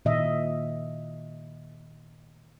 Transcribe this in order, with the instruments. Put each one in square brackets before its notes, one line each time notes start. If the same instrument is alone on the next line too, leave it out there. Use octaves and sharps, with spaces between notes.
[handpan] A#2 D#3 D#5 E5